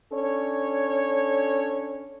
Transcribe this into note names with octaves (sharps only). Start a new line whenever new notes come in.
C#4 D4 A4 C#5